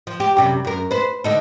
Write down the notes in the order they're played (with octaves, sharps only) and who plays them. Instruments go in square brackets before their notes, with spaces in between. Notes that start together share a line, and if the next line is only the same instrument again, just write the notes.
[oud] F3
G4
F#2 C3 G3
F#2 A#4
B4 C5
D3 D#4 A4